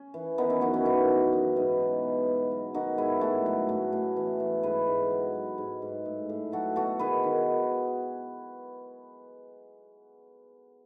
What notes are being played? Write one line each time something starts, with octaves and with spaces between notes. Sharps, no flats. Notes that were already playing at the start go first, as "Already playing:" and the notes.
Already playing: C#4
E3
D#3 B3 D#4
C#4 E4
F#2 D#4 F#4
C#4 E4
E3 B3 D#4
F#2
E3 C#4
G#2 B3 D#4
B2
B2
B2
F#3
D#3 D#4 F#4
G#2 E4 G#4
A2 F#4 A4
F#3
A2
A2
E3
E3
G#2 G#4 B4
G#2
F#3
F#3
G#2
G#2
A2
A2
F#3 F#4 A4
B2 F#4 A4
D#3 G#4 B4
D#3